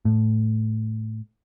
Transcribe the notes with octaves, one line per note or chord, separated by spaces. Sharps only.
A2